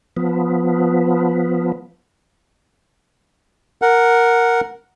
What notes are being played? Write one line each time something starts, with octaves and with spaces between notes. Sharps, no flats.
F3 B3
A#4 F#5